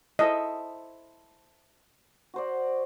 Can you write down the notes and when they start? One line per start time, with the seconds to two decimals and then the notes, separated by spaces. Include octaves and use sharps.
0.19 E4 A4 C5 D#5
2.34 F#4 C5 D5